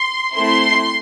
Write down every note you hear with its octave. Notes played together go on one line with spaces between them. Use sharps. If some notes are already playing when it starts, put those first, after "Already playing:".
Already playing: C6
A3 C4 E4 A4 C6